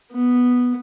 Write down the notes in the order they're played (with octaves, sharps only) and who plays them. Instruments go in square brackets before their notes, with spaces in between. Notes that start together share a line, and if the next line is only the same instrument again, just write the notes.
[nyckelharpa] B3